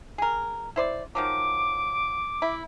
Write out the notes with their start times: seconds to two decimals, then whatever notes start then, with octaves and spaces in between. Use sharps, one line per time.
0.18 G#4 A#4
0.76 E4 C5 D5
1.15 D#3 F3 F#3 D6
2.42 E4